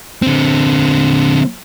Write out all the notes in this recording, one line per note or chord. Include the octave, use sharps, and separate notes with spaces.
D3 C4